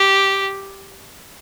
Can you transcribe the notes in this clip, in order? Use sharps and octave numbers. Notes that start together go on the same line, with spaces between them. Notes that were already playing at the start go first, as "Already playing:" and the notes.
Already playing: G4